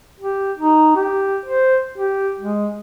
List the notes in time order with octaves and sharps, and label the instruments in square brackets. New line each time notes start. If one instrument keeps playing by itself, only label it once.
[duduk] G4
D#4
G4
C5
G4
G#3